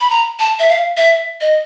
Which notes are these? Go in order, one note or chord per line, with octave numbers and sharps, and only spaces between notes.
B5
A#5
A5
E5
F5
E5
D#5